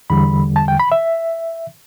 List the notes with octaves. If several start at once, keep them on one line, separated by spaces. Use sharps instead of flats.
E2 D3 G3 B5
A5
G5
B5
E5